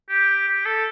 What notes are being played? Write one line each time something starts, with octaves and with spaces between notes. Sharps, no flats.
G4
G4
A4